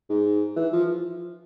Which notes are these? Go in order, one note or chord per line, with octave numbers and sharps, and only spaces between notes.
G#2
E3
F3